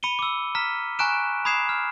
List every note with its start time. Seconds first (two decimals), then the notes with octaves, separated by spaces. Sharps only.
0.03 B5 C#7 D#7 G7
0.19 D6 E6
0.55 A#5 F6 B6
0.99 G#5 A#5 C#6 F#6 D7 E7
1.45 B5 D#6 G#6 C7 E7
1.69 F6